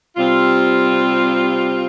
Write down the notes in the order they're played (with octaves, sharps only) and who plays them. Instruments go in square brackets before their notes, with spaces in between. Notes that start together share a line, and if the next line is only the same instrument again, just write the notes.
[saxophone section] C3 G3 C4 F4